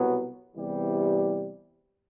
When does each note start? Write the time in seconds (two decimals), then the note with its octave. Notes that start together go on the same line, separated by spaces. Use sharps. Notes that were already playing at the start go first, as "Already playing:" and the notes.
Already playing: C2 B2 F#3 B3
0.56 E2 C3 E3 G3